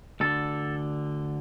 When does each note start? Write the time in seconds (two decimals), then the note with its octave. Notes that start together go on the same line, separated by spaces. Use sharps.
0.20 D2 D3 A4